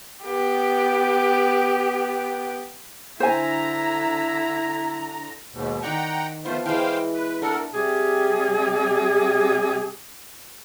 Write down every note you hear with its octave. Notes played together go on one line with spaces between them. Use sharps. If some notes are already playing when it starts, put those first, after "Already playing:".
B3 G4
D3 E4 C5 G#5 A#5
D#2 G#2 B2
D#3 D5 F#5 G5 A#5 C#6
F3 A3 B3 F4 C5
E3 G#3 C5 F5 G5
B4
A3 D4 A4 A#4 F#5
C3 G3 G4 G#4